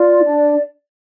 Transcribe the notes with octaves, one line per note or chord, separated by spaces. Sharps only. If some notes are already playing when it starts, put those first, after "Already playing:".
Already playing: F4 D5
D4